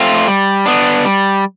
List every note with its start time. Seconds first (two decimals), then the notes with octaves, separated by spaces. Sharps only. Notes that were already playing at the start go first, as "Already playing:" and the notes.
Already playing: A3 C4 F4
0.27 G3
0.66 B3 D4
1.05 G3